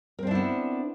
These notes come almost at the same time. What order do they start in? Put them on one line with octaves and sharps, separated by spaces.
A#4 C4 D4 E4 B3